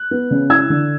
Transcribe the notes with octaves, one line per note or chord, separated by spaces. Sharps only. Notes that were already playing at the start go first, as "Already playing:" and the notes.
Already playing: F#6
B3
C#3
E4 E6 G#6
D3